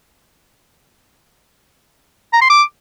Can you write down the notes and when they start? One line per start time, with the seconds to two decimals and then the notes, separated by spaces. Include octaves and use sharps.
2.33 A#5
2.41 C6
2.50 D6